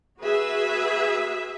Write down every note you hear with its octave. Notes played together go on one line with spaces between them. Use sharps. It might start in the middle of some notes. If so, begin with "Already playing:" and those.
F#4 G#4 B4 E5